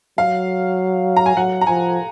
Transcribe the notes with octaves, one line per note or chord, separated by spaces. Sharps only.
F#3 F5
A#5
G#5
F#3 F#5
A#5
F3 G#5